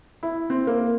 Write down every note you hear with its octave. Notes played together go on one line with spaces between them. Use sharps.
E4
C4
A#3